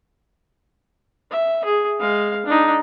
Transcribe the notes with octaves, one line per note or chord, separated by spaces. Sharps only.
E5
G#4
G#3 F5
D4 D#4